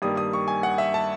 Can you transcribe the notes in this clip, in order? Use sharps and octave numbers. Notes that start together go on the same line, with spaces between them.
G2 D#3 G3 A#3 D#6
D#6
C#6
G#5
F#5
E5
A5